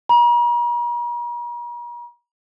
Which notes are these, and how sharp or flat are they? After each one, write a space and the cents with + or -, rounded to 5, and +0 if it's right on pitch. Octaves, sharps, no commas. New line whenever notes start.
A#5 +45